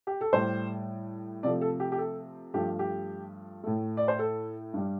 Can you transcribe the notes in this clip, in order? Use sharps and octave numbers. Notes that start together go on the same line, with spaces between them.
G4
A4
A2 G3 C5
C3 F3 A3 D5
A4
G4
G4
A4
G2 F3 A3 G4
G4
A2 A3
D5
C5
A4
G2 G3